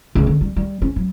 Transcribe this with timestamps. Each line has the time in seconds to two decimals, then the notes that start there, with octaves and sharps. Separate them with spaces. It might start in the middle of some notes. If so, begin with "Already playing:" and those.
0.15 C#2
0.27 D3
0.41 G3
0.56 G3
0.82 C#4
0.96 F#3